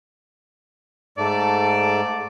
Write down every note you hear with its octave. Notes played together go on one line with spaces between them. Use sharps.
G#2 A3 A4 D5